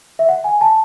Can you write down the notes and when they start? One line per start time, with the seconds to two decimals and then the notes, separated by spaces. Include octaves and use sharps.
0.19 E5
0.29 F#5
0.44 G#5
0.61 A5